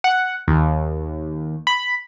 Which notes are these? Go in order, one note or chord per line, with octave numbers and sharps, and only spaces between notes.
F#5
D#2
B5